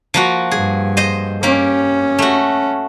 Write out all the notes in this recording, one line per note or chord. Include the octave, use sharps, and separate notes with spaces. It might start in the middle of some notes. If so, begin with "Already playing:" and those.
F3 A#3 F#4
G2 G#4
C5 D#5
A#3 C#4 G4
A3 F#4